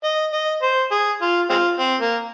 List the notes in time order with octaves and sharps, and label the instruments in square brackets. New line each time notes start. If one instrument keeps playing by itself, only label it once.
[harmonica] D#5
D#5
C5
G#4
F4
G#3 C4 F4
C4
A#3